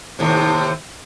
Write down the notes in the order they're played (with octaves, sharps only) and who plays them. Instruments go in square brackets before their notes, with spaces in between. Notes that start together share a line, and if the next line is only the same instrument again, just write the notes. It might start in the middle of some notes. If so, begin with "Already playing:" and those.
[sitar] D#2 A2 C3